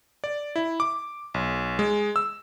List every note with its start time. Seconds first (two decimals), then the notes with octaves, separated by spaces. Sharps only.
0.24 D5
0.56 E4
0.80 D6
1.34 B1
1.79 G#3
2.16 E6